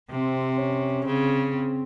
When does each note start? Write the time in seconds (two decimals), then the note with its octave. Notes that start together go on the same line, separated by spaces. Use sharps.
0.10 C3 C4
0.57 C#4
1.05 C#3 C4
1.53 C4